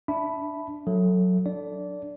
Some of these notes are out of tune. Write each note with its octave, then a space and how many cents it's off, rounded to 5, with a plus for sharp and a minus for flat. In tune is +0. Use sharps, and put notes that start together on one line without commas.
D4 +0 E5 +0 B5 +0
F#3 -10 A4 +10 E5 +0
D4 +0 D5 -20